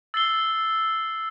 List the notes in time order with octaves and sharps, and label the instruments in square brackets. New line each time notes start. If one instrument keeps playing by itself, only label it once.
[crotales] E6 A6 C7 G7